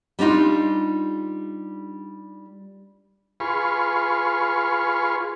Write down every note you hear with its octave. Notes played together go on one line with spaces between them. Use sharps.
G3 D4 D#4 F4
F4 G#4 B4 C6 C#6